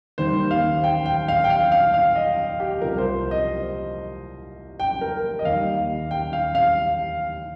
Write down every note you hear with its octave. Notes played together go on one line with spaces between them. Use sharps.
D#2 D#3 G3 A#3 C5
F5
G5
G5
F5
G5
F5
F5
F5
D#5
G4
C2 C3 F3 A#4
C5
D#5
G5
A#4
D#5
D#2 D#3 G3 F5
G5
F5
F5